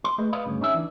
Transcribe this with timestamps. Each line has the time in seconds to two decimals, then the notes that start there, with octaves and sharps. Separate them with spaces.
0.04 C6
0.18 A3 G#4 B4 D#5
0.33 B4 D5 D#5 F5 B5
0.46 D2 G2 C#3
0.61 C#4 D#4 G#4 E5
0.74 E3 D4